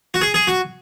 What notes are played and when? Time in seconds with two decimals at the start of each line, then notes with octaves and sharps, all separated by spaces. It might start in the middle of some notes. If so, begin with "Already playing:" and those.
0.14 F#4
0.21 G#4
0.34 G#4
0.47 F#4